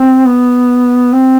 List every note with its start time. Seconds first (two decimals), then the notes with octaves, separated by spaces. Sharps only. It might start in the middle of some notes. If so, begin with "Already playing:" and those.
Already playing: C4
0.26 B3
1.13 C4